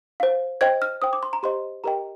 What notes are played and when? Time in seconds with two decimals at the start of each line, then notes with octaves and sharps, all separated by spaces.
0.20 C5 F5
0.61 C5 D#5 G5 G#6
0.82 F6
1.02 C5 G5 D#6
1.13 D6
1.23 C6
1.33 A#5
1.43 G4 C5 D#5 C6
1.84 G4 A#4 D#5 G5 A#5